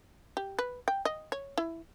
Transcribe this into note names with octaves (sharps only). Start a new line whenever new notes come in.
G4
B4
G5
D#5
C#5
E4